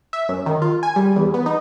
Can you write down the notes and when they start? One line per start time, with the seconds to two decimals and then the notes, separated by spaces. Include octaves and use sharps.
0.13 E5
0.29 F#2
0.46 D#3
0.62 F4
0.83 G#5
0.96 G3
1.16 E2
1.34 B3
1.46 D#4